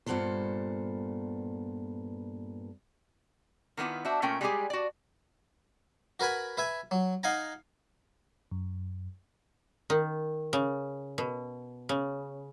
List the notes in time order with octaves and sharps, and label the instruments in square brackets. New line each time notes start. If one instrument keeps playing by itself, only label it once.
[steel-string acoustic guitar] G2 A#2 A3 B3 A4 C5
[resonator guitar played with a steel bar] D#3 A#3 B3 E4 F4
D4 F#4 C5 E5
A#2 A3 C#4 A#4 G5
G3 G#3 C4 D#4 G4 G#4
F#4 D5
[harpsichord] F#4 A#4 B4 G#5 B5
B4 E5 G#5
F#3
D#4 F5 F#5 G#5 A#5
[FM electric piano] F#2
[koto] D#3
C#3
B2
C#3